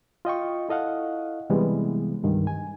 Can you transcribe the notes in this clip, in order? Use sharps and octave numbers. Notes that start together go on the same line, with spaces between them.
F4 D#5 G5 C#6
E4 A4 D#5 F5 F#5
C3 E3 G3 G#3 B3
C2 G2 D#3
G#5